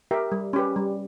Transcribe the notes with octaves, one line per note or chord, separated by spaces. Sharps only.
G4 A#4 E5 G5
G3
C#4 G4 B4
G3